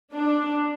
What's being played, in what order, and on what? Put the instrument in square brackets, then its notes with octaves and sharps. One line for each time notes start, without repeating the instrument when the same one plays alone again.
[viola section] D4